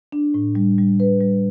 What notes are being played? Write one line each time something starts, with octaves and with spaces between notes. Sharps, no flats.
D4
A2
G3
G3
B4
G3